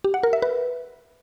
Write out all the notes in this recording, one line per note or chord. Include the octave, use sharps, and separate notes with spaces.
G4
F#5
A#4
E5
B4